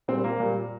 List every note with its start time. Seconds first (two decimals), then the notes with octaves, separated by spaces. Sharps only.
0.08 A#2 G3 C4
0.24 A#3
0.40 A#2 G3